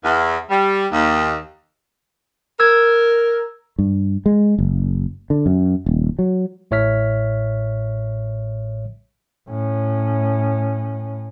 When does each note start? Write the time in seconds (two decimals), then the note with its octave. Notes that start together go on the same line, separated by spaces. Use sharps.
0.05 E2
0.50 G3
0.92 D#2
2.60 A#4 E6 G#6
3.79 G2
4.26 G#3
4.59 F#1
5.30 D3
5.46 F#2
5.86 D#1
6.19 F#3
6.71 A1 A2 C#5 E5 F6 B6
9.49 A2 C#4